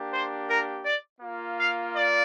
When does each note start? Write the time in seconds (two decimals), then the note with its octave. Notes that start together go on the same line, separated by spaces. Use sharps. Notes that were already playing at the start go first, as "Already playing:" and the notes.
Already playing: A#3 D4 G4
0.12 C5
0.47 A#4
0.84 D5
1.21 A#3 F4
1.58 F5
1.94 D5